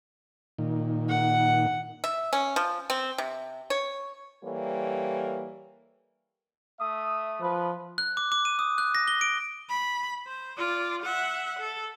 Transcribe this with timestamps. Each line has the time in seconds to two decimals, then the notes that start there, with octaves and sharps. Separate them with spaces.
0.58 A#2 D#3
1.09 F#5
2.04 E5
2.33 C#4
2.56 F3
2.90 C4
3.18 C3
3.70 C#5
4.44 E3 G3 A#3 A4 C#5
6.79 A3 E5 D#6
7.41 F3 B4
7.98 F#6
8.17 D6
8.32 D6
8.45 D#7
8.59 D#6
8.78 F#6
8.95 A#6
9.08 G7
9.21 D7
9.69 B5
10.27 C5
10.57 F4 D5
11.02 E5 F#5
11.59 A4